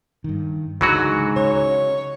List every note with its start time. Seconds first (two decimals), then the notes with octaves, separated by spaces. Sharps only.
0.24 G2 D#3
0.81 C#2 G#2 D3 E3 F#3 F#4
1.36 C#3 C#5